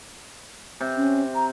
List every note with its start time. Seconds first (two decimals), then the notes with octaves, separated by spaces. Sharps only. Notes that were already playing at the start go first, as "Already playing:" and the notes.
0.81 C3
0.97 C#4
1.35 A#5